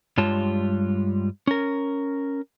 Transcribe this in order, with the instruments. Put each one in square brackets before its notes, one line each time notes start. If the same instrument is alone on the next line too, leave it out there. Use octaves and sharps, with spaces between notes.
[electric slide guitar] G2 G3 G#3 F4 C#5 A5
C#4 A#4